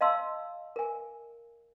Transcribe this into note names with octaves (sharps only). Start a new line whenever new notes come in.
D#5 F5 A5 C6 E6
A#4 G#5